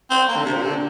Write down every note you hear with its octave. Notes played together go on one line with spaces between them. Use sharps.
C4
A#3
D3
C3
A#2
D3